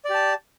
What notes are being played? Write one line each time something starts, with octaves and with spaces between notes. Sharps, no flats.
G4 D5 A5